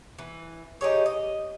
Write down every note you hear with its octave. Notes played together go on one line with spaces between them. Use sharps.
E3
D#4 G4 G#4 C#5
D#5